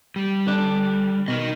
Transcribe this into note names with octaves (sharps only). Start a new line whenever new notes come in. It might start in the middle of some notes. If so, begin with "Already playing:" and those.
G3
D3 D4
B2 D#4 A#4 D#5